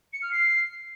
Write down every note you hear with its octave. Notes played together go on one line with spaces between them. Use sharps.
C#7
F6
C7